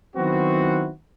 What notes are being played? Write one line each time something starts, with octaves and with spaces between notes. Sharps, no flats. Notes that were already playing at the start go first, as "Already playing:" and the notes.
D#3 F#3 B3 C4 E4 F#4